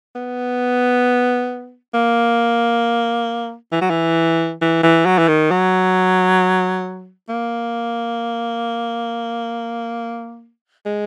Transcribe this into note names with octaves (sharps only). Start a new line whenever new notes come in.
B3
A#3
E3
F#3
E3
E3
E3
F#3
E3
D#3
F#3
A#3
G#3